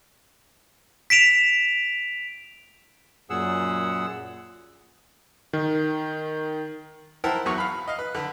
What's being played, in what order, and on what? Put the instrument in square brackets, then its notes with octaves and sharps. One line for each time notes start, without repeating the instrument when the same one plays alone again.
[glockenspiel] B6 D7 E7 F7
[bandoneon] F#2 A#2 G#4 F#5 E6
[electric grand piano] D#3
[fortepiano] E4 A#4 C5 F#5 G5 A5
E2 F#3 F#4 C#6
F5 B5
D#5 F5
B4
D3 B4